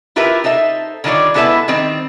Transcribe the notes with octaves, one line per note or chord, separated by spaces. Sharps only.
E4 F4 G4 A#4 B4 E5
D#4 A4 C5 E5
D3 D#3 G3 F4 C#5 D5
G#3 B3 E4 A4 B4 E5
D#3 G3 C4